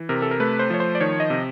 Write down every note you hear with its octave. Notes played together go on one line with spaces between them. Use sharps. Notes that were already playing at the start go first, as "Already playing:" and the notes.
Already playing: E3
C3 A#4
A4
A#4
A3 B4
C5
F3 C#5
C5
D5
D#3 C#5
D#5
C3